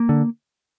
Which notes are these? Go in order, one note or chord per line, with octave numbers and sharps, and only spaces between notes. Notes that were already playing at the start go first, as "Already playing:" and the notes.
Already playing: A#3
D3